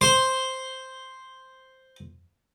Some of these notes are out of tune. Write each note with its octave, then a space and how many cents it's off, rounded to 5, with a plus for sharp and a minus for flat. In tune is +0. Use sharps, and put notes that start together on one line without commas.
C5 +0 C6 +0